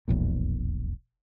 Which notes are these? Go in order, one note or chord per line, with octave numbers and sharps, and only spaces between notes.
E1 B1 F2 A#2